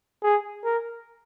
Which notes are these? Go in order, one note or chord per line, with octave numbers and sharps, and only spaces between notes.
G#4
A#4